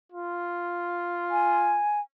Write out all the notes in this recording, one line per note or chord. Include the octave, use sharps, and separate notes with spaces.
F4
G#5